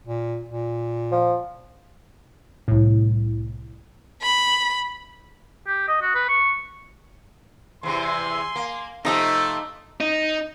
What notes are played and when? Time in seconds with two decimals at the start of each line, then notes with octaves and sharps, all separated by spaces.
0.07 A#2
0.49 A#2
1.12 F3
2.68 C2 A2
4.22 B5
5.67 G4
5.88 D#5
6.02 F#4
6.15 B4
6.29 C#6
7.83 E2 C3 E3 G#5 C6
8.56 A#3
9.05 C3 F3 A3 D#4 D#5 E5
10.00 D#4